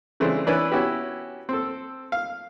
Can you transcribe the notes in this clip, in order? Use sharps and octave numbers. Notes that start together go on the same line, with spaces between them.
C#3 E3 G#3 A3 C4 D4
E3 C#4 D4 E4 B4
B3 C#4 E4 F#4 G4 B4
C4 A4
F5